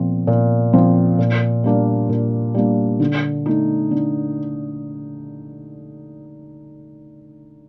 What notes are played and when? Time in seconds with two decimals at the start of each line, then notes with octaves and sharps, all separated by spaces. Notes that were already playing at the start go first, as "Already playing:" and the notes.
Already playing: A#2 F3 C4
0.27 A#2
0.73 F3 C4
1.19 A#2
1.64 G3 A#3 D4
2.09 A#2
2.54 G3 A#3 D4
3.00 D3
3.46 A3 D#4
3.91 D3